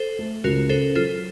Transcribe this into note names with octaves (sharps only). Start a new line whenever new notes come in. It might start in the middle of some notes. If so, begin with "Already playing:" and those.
Already playing: A4 C5
A3
C#2 F#4 A#4
C#3 A4 C5
F#3 F4 A4